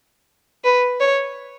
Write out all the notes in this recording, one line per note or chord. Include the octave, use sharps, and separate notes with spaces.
B4
C#5